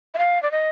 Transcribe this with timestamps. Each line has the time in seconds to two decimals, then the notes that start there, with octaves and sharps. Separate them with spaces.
0.14 E5
0.18 F5
0.43 D5
0.51 D#5